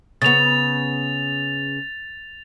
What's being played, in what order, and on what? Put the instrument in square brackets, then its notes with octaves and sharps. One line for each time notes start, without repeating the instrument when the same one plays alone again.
[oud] C#3 B3 [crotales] A6 F7